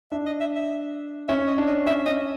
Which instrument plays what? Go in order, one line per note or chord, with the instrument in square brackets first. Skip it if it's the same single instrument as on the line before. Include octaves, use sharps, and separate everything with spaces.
[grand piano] D4 [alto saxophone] E5
[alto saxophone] D#5
E5
E5
[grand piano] C#4 [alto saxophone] E5
[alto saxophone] D#5
[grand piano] D4
[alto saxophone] D#5
[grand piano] C#4 [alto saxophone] E5
[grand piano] C#4 [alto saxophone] D#5